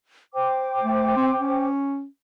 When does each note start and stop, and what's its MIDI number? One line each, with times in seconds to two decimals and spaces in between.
0.33 1.68 72
0.33 1.68 79
0.33 1.68 86
0.82 1.16 57
1.16 1.31 60
1.40 2.06 61